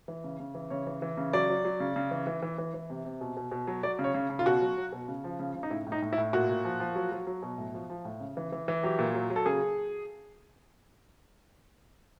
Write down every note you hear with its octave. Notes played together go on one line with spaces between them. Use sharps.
E3
C#3
C#3
E3
C#3 C#5
E3
E3
C#3
F#3 D5
F#3
F#3
C#3
C#3
E3
E3
E3
E3
E3
C3
C3
B2
B2
B2
F#3
F#3 D5
C#3
C#5
C#3
C#3
F4
B2 F#4
F#3
F#3
B2
C#3
F3
C#3
C#3
D#4
A2 E4
A2
D#4
A2
E4
A2
A#2 F#4
A#2
F3
F3
F#3
F#3
F#3
B2
A2
F3
F3
A2
C#3
E3
E3
E3
F#3 G4
A#2
F#3
F#3
A4
C#3 G#4